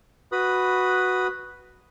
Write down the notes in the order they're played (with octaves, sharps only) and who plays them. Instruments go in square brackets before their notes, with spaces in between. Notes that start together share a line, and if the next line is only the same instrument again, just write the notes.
[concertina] F#4 B4 B5 D#6